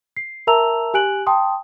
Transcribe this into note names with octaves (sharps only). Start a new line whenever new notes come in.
C7
A#4 E5 A5 A#5 E6 F7
G4 G#5 F#6 D7 F#7
G5 A5 C6 D#6